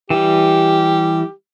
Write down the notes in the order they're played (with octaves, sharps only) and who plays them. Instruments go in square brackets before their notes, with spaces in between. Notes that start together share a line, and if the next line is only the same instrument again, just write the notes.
[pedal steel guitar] E3 G3 [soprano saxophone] G4